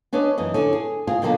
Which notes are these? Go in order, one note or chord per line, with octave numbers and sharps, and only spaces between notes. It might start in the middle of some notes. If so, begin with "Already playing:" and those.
C#4 D4 B4 C#5 D#5
F#2 E3 D#5
D3 C#4
G#4
C#3 C4 F4 G#4
B2 D3 D#3 F#3 A#3 F4